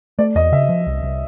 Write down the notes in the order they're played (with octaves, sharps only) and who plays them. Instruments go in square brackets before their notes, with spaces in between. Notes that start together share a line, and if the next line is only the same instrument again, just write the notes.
[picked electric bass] A3 [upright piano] D5
[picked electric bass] E2 [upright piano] D#5
[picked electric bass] C#3 [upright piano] E5
[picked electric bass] F3
C2
C2